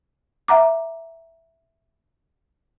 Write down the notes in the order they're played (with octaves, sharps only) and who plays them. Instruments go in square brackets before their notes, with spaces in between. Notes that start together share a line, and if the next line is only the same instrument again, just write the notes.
[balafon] E5 F#5 A#5 D6